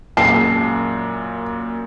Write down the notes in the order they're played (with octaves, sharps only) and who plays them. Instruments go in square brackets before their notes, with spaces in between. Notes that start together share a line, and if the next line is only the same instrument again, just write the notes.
[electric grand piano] F#2 A#2 [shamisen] G#3 G5 A5 [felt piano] C7